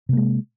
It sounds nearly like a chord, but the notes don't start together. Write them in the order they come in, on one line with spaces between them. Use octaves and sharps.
C3 A#3 G#3